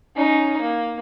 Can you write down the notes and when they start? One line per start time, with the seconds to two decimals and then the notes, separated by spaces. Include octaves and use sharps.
0.15 C#4 D#4
0.61 A#3